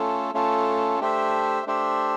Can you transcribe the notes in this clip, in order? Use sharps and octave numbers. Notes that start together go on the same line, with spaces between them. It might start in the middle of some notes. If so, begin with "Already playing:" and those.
Already playing: A3 C#4 F4 A4
A3 C#4 F4 A4
A3 D4 G4 C5 E5
A3 D4 G4 C5 E5